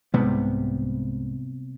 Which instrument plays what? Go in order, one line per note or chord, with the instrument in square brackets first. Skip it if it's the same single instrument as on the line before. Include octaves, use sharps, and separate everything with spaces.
[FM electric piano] C2 G#2 [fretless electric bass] C3 G3 B3